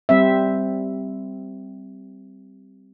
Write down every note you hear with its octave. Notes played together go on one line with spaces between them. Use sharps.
G3 C4 E5